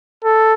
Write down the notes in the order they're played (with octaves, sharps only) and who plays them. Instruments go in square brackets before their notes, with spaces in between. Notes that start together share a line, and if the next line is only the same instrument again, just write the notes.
[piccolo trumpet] A4